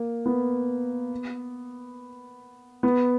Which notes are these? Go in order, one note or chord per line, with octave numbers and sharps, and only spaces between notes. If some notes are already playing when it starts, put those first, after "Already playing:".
Already playing: A#3
B3
B3